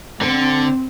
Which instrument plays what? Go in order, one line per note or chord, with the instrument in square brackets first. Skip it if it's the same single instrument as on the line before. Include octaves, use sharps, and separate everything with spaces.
[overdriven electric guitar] D3 [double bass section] C4